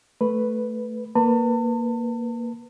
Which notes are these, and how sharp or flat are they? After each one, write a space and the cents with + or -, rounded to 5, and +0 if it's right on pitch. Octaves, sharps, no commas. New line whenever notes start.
A3 +0 B4 +0
A#3 +0 B4 +0 A5 +40